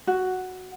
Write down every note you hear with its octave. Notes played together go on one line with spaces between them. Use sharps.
F#4